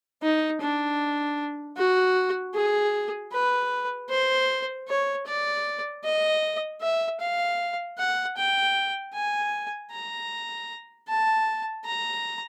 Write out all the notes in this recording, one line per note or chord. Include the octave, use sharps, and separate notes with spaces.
D#4
D4
F#4
G#4
B4
C5
C#5
D5
D#5
E5
F5
F#5
G5
G#5
A#5
A5
A#5